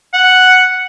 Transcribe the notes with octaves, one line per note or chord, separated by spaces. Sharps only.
F#5